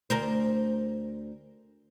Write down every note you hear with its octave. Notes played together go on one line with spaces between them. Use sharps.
D2 A#4 C5